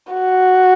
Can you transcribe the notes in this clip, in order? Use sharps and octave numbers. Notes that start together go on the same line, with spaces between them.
F#4